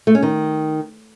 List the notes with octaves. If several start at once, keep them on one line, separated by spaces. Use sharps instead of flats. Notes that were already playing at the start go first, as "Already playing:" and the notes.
A3
C#4
D#3